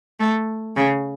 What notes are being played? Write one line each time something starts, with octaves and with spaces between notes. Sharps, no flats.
A3
C#3